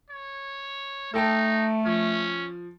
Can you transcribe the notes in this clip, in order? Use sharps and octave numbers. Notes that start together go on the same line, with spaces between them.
C#5
A3 D#4 A4 G5 A5
F3 C#4